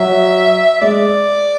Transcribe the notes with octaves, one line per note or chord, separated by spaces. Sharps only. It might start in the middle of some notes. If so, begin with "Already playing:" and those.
Already playing: F#3 E5
G#3 D5